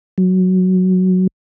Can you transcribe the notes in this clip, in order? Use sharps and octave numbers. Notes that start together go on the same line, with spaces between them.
F#3